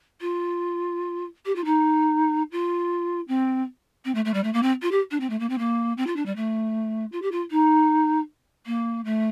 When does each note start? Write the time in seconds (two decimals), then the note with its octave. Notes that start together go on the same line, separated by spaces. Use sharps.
0.21 F4
1.45 G4
1.55 F4
1.65 D#4
2.51 F4
3.28 C4
4.05 C4
4.15 A3
4.25 A3
4.34 G3
4.43 A3
4.53 A#3
4.62 C4
4.82 F4
4.91 G4
5.11 D4
5.20 C4
5.30 A3
5.39 A#3
5.49 C4
5.58 A#3
5.97 C4
6.06 F4
6.16 D4
6.26 G3
6.36 A3
7.12 F4
7.22 G4
7.31 F4
7.51 D#4
8.66 A#3
9.05 A3